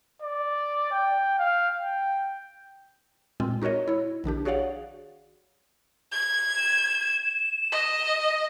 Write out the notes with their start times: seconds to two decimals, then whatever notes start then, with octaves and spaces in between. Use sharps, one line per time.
0.22 D5
0.92 G5
1.39 F5
1.81 G5
3.40 A#2 G#3 C4 F4
3.62 D#4 F#4 A#4 C#5 D#5
3.88 E4 C#5
4.24 A#1 D#3 D4 G4
4.45 F#4 G#4 C#5 D5 F5 F#5
6.12 G#6
6.57 E7
7.72 D#5